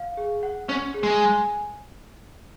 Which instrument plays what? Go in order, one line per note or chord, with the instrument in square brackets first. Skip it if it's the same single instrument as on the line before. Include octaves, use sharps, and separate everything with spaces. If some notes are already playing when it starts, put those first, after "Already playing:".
Already playing: [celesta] F5
G#4
F#5
[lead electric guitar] C#4 [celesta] C5
[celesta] G#4
[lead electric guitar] G#3
[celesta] G#5